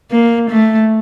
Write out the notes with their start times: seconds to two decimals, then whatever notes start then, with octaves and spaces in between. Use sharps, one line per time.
0.11 A#3
0.50 A3